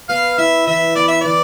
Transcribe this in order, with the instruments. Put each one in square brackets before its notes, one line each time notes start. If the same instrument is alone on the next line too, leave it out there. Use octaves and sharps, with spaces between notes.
[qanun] B3 [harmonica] F5
[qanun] E4 [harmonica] E5
[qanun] E3 [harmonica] E5
[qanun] B3 [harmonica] D5
[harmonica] E5
[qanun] E3 [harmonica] D5